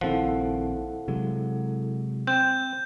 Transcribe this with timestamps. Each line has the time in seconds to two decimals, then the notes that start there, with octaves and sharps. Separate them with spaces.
0.01 A#1 D#3 F3 C4 E4 A4 F#5
1.08 C3 F#3 G#3
2.27 C4 G6